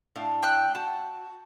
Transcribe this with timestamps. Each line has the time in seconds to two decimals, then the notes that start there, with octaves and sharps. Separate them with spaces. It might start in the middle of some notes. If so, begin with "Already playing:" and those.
0.16 A2 D4 F5
0.43 G5 E6 F#6
0.75 F#4 A5